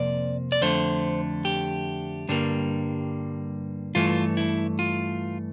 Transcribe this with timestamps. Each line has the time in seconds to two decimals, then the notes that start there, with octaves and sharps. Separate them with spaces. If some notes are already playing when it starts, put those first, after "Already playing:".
Already playing: F2 C3 A#3 D5
0.52 D5
0.61 F2 D3 A3 C5
1.45 G4
2.29 G2 D3 G3 A#3
3.95 G2 E3 A3 F4
4.37 E4
4.79 F4